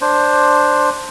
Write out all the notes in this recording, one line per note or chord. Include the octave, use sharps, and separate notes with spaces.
D4 C5